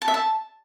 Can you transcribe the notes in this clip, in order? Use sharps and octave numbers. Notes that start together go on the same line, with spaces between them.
A5
E5
A5